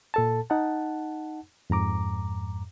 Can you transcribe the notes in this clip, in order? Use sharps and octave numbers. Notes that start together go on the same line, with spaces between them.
A#2 A4 A5
D#4 F#5 A5
F2 G#2 A#5 D6